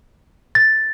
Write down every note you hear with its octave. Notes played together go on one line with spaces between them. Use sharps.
A6